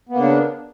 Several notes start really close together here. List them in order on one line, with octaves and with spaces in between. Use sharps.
B3 A#3 C#3 D4